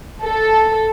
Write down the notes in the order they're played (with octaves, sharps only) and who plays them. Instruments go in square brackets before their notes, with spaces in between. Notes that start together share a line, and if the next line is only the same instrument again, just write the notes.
[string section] A4